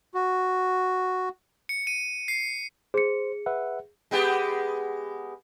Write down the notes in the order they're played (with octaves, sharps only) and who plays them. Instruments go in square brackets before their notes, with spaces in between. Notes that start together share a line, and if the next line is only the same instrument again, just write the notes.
[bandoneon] F#4
[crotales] C#7
D#7
C7
[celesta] G#4 C#7 [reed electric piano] C5
[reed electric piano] B4 E5 F#5
[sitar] G#3 B3 G4